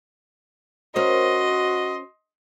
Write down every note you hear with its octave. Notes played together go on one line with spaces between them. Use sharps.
C#4 F#4 A#4 C5 D#5 C6